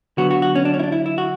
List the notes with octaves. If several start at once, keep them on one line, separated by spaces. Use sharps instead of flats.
D3 F#3 B3 F#4
F#4
F#4
C#4
D4
C#4
E4
D4
E4
E4
F#4